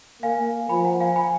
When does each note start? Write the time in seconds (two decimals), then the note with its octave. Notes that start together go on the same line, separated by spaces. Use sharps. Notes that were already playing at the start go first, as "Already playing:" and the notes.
0.22 A#3 F5 G#5
0.69 F3 G#5 B5
0.85 F#5 A#5
1.01 F5 G#5
1.16 G#5 B5